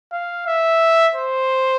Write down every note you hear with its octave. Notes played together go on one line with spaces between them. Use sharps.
F5
E5
C5